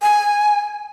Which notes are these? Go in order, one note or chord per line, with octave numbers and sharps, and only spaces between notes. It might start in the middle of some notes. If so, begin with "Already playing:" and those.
G#5